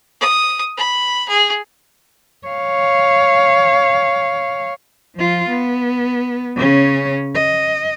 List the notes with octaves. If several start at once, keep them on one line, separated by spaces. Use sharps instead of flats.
D#6
B5
G#4
C#5 F5
F3 F4
B3
C#3 C#4
D#5